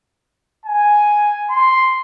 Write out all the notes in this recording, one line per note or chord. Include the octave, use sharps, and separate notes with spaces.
G#5
C6